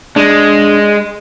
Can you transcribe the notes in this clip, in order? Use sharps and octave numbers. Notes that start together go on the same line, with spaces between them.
G#3 D4